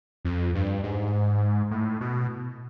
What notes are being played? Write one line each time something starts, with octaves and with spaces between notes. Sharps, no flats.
F2
G2
G#2
A2
B2